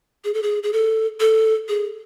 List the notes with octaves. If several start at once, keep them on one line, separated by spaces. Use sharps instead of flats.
G#4
A4
G#4
G#4
A4
A4
G#4